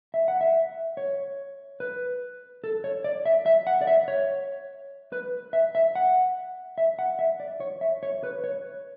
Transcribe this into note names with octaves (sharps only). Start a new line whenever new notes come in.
E5
F#5
E5
C#5
B4
A4
C#5
D5
E5
E5
F#5
D5
E5
C#5
B4
E5
E5
F#5
E5
F#5
E5
D5
C#5
E5
C#5
B4
C#5